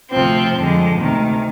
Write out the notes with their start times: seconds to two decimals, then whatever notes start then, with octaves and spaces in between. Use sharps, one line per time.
0.10 D2 C3 F3 C4
0.56 F2 D3 G#3
1.00 D2 C3 D#3